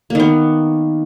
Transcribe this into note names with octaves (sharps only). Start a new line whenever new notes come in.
D#3 A#3 B3